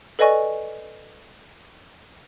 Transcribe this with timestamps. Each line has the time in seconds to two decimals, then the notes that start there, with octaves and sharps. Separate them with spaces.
0.19 A4 B4 D5 D#5 G#5 C#6